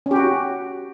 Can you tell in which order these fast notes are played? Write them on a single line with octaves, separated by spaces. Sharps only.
C#4 G4 F#4